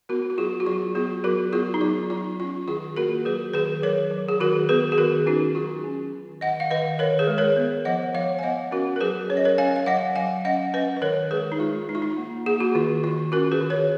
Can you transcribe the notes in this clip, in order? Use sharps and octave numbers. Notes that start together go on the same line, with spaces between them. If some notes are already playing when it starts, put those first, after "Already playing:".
B3 F#4 A#4
F#4
F#3 F4 G#4
F#4
F#3 F4
B3 F4 G#4
F#3 F#4 A#4
B3 F4 G#4
D#4
F#3 F4
F#3 F4
C#4 F4
D#3 F4 G#4
A#3 F#4 A#4
F#3 G#4 B4
D#3 G#4 B4
F#3 A#4 C#5
F#3
G#4
D#3 F#4 A#4
B3 G#4 B4
G#4
D#3 F#4 A#4
C#4 D#4 F#4
F#3 F4 G#4
C#4
D#3
D#3 D#5 F#5
F5
D#3 B4 D#5
D#3 A#4 C#5
G#4 B4
G#3
A#4 C#5
B3
F3 D#5 F#5
F3 C#5 F5
G#5
B3 D#5 F#5
C#4 F#4 A#4
A#4
F#3 G#4 B4
C#4 C#5
D#5
A#4 C#5
C#4 F5 G#5
F5
F#3 D#5 F#5
F#3 F5 G#5
C#4 D#5 F#5
C#4 B4 D#5
B4
D#3 A#4 C#5
G#3 G#4 B4
D#4
G#3 F4
G#3 D#4
F4
D#4
A#3
A#3 G#4
F#4
D#3 F4
D#3 F4
C#4 F#4 A#4
G#4 B4
D#3
A#4 C#5